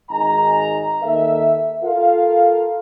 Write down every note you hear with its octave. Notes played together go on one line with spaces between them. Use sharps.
G#1 G#2 D#4 G#5 A#5
D#2 D#3 A4 A#4 E5
F4 A4 A#4 F5